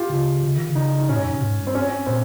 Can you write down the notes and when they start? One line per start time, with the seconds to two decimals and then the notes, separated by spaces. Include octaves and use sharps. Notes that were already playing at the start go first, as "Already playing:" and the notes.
Already playing: F4 G4
0.10 C#3
0.43 C#3
0.56 D#3
0.69 C#3
0.75 D#4
0.99 D#4
1.09 A#2 C#4
1.17 G2
1.25 F2
1.33 C3
1.41 G#2
1.58 G2
1.67 C4
1.75 C#4
2.06 A#2 C4